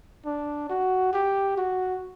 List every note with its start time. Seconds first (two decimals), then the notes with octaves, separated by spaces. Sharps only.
0.25 D4
0.69 F#4
1.13 G4
1.57 F#4